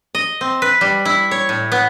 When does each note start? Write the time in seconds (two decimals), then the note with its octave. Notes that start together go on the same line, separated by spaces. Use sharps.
0.15 D#5
0.41 C4
0.62 B4
0.81 G3
1.05 E4
1.31 C#5
1.49 A2
1.72 B3